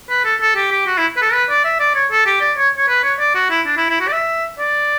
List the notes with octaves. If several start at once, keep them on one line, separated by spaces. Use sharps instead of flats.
B4
A4
A4
G4
G4
F#4
E4
B4
A4
B4
D5
E5
D5
C#5
A4
G4
D5
C#5
C#5
B4
C#5
D5
F#4
E4
D4
E4
E4
F#4
D5
E5
D5